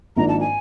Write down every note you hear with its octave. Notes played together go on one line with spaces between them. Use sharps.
G#1 G#2 F3 A#3 D4 A#5
A5
G#5